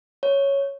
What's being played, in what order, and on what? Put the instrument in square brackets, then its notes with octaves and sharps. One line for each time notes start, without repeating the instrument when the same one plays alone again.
[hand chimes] C#5